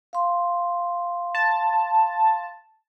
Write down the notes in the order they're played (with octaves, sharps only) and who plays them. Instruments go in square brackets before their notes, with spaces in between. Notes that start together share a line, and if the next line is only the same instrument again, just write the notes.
[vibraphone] F5 C6
[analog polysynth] A5